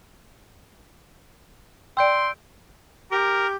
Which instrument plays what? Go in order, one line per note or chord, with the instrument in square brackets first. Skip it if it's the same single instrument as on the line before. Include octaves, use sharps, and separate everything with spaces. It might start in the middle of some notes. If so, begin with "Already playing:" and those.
[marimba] D5 G5 [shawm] C6 [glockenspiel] E6 G6 D7
[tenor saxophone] G4 [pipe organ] A#4